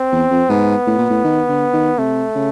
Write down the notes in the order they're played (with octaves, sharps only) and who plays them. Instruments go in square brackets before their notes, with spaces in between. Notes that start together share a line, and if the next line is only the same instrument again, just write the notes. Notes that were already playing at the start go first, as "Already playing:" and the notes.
Already playing: [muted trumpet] C4
[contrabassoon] E2
F2
[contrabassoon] G#2 [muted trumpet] B3
[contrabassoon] A2
A#2
A2
D#3
D3
D#3
[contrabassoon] C3 [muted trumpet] A3
[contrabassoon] C#3